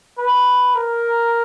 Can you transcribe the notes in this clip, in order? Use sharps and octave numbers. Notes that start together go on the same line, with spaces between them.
B4
A#4